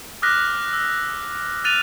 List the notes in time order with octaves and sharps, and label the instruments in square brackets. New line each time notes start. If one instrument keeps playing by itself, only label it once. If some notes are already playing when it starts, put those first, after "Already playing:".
[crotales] D6 D#6 F6 F#6 A#6 B6
E6
F6 F#6 A6 D#7 F7